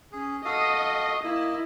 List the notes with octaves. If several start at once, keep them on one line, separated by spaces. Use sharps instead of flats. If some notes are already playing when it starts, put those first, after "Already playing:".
C#4 G#4
F#4 A4 D#5 F5 D#6
A#3 E4 D#5